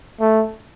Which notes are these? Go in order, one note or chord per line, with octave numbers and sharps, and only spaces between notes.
A3